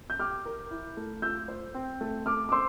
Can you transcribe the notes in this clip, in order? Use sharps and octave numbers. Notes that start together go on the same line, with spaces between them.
G6
G4 D6 F6
A#4
E4
A3
F4 E6 G6
C5
C4
A3
A4 D6 F6
D6
C5 C6 E6